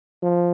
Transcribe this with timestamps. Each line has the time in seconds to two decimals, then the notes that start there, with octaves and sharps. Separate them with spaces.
0.22 F3